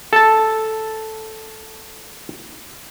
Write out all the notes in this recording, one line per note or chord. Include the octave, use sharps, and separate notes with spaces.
A4 A5